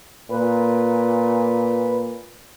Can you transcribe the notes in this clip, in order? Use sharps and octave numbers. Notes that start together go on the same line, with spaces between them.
A#2 B4